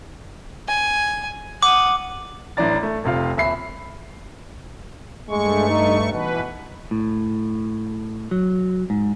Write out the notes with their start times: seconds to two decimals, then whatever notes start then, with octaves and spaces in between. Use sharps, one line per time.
0.68 G#5
1.63 F#5 D6 D#6
2.57 A1 E3 D4 D5 A#5 A6
2.83 A3
3.04 F1 C3 F4 F5
3.37 D#1 E5 B5 C7
5.29 G2 G#3 A3 C#6
5.69 D#4
6.11 B2 E3 B4
6.91 A2
8.31 F#3
8.90 G#2